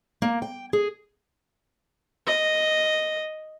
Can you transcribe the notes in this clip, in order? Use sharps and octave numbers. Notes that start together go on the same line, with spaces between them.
A#3
G5
G#4
D#5